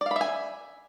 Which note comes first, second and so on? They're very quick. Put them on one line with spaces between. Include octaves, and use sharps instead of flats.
D5 F5 B5 E5 G#5